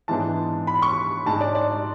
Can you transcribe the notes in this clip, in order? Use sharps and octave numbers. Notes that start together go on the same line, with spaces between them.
G#2 E3 G#3 B3 D4 A5
B5
C#6
G#2 G#3 D4 A5
D5
D5